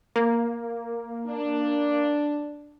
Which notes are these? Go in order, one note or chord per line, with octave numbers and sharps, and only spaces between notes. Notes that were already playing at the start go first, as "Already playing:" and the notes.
A#3
D4